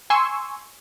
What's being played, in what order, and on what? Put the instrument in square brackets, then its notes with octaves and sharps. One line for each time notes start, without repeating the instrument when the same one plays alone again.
[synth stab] G#5 C6 C#6 E6